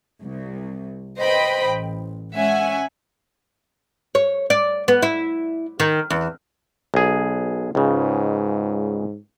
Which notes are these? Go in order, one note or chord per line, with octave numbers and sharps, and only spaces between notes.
C2
B4 C5 D#5 G5 B5
A1
G#3 C#4 E5 F#5 G#5
C#5
D5
B3
E4
D#3
E2
B1 G#4
C#2 G#2 C#3